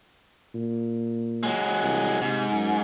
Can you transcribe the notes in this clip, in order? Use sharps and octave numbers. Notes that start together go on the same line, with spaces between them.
A#2
F#3 G#3
C2
G#2 C3
F#2